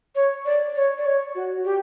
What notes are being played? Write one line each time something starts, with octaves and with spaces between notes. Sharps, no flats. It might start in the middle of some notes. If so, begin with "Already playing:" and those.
C#5
D5
C#5
D5
C#5
F#4
G4